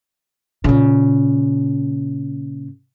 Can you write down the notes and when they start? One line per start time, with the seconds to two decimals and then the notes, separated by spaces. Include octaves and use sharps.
0.64 A#2 C#3